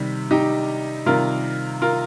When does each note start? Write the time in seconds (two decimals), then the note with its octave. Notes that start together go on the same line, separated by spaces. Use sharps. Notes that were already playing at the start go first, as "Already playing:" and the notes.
Already playing: C3 D#3 G3
0.31 D#4 G4
1.06 C3 D#3 G3 F4 A#4
1.82 F4 A#4